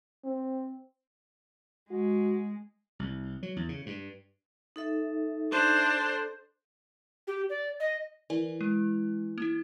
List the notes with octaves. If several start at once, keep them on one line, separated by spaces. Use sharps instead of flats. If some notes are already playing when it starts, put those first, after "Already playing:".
C4
G#3 F#4
C2
F#3
E2
C#3
G2
D#4 A4 E5
D4 C5
A4
G4
D5
D#5
E3 A#4 D5 G#5
G#3
A#3 E4